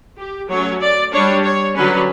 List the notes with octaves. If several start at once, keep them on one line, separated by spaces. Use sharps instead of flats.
G4
F#3 A3 C#4 C#5
D5
G3 D4 C#5
C#5
D3 F#3 C#4 B4